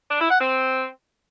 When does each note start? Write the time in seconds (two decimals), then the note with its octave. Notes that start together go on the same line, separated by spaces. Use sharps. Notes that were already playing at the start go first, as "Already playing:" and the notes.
0.09 D4
0.19 E4
0.29 F#5
0.39 C4